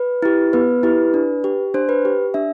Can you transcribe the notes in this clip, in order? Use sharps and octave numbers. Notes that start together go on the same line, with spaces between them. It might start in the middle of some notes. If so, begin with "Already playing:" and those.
Already playing: B4
E4 G4
B3 B4
E4 G4
D4
G4
D4 C5
B4
G4
D4 E5